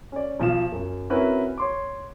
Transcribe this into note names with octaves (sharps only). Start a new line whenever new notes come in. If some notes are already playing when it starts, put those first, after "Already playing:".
C#4 D5
B1 F3 F5 E7
F#2
C4 C#4 E4 F#4 A#4 B4
C#5 C6 D6